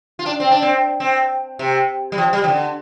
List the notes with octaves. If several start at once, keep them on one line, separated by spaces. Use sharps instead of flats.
F4
D4
C4
D4
C4
C4
C3
G3
F3
G3
F3
D3